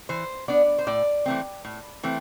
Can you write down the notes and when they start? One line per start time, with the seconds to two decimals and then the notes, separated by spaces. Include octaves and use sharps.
0.09 E3 C5
0.48 B3 D4 D5
0.78 C5
0.87 A2 D5
1.26 E3 A3 C4
1.65 A2
2.03 E3 A3 C4